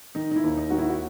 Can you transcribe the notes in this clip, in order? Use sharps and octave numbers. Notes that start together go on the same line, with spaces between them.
D#3 D#4
D#4
E4
D#2
D#4
D#3 F#4
E4
F#4